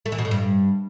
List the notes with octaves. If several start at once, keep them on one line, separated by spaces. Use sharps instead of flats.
A3
E3
B2
A2
G2